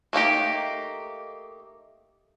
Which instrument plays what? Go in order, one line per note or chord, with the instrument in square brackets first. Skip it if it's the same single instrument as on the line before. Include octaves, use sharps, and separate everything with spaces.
[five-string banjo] A3 A#3 D#4 G4